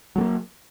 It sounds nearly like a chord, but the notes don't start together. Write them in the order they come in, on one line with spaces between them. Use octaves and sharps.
F#3 A3 A#3